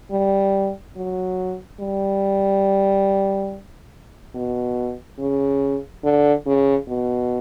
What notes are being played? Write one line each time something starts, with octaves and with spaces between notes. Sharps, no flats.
G3
F#3
G3
B2
C#3
D3
C#3
B2